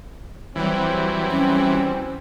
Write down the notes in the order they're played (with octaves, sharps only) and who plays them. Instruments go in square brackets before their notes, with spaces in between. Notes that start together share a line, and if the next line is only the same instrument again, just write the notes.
[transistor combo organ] E3 [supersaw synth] F#3 G3 [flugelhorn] C4
[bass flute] C#4